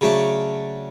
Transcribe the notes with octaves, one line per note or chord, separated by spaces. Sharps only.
C#3 F#3 A3 D4